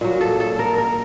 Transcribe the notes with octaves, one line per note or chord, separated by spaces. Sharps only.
A#2 F#3
A4
A4
A#4
A#4